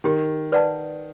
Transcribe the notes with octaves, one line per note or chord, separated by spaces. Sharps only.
D#3 G4
B4 D5 F#5 A5